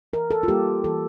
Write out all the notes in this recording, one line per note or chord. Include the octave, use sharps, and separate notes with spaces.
E3 A#4
A4
F4
G3 A#3 G4
E3 A4